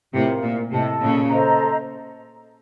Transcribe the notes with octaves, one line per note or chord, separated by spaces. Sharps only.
A2 C3 F4 A#4 F5
A#2
A2 C3 A4 D#5 A5
A#2 C#3
A4 C5 D#5 A#5